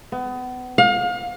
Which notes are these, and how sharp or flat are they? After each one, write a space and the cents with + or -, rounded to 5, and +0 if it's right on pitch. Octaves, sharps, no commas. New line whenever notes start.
B3 +30
F5 +35